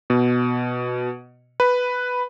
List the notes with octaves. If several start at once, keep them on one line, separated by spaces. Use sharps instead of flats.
B2
B4